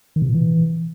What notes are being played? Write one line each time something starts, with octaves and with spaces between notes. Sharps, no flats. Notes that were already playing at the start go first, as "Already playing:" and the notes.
D#3
C3
A#2
E3